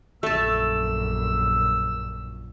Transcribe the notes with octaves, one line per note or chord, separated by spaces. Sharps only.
A#1 F#2 A3 A5 E6